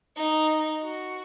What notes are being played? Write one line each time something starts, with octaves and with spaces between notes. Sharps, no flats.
D#4
F#4